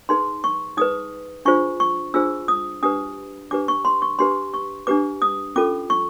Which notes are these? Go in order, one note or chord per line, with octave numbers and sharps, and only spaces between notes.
D#4 G#4 B4 C6
C#6
D#4 G#4 B4 D#6
D4 F4 G#4 C5 C#6
C#6
D4 F4 G#4 C5 E6
D#6
D4 G4 B4 D#6
D4 G4 B4 D6
C#6
C6
C#6
D4 G4 B4 C6
C#6
D4 G4 B4 D6
D#6
C#4 F4 A4 D6
C#6